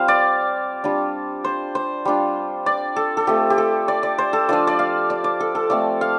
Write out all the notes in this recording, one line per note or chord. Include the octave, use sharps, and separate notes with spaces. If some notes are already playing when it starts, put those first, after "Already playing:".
Already playing: G3 C4 F4 C5 F5
D5
G3 D4 F4
C5
C5
G3 D4 F4
D5
A4
A4
A3 C4 F4 G4
G4
A4
D5
D5
C5
A4
F3 D4 F4 D5
D5
F5
D5
D5
A4
A4
F3 A3 C4 D5
F5